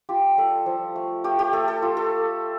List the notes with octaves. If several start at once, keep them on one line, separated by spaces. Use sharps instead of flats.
F4 G4
G3 A4
F3
A3
A3 G4
G4
A3 A4
A4
F4
A4